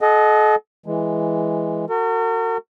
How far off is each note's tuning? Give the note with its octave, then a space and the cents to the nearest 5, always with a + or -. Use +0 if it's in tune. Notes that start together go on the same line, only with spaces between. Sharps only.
A4 -40 D#5 +0 F#5 +0
E3 +0 G#3 +0
F#4 +0 A#4 -45